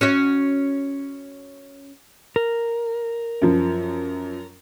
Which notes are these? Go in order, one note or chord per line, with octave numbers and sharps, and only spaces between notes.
C#4 F#4 C#5
A#4
F#2 F3